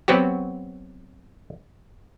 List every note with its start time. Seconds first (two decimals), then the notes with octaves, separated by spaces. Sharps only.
0.08 F#3 B3 C4 F#4 G4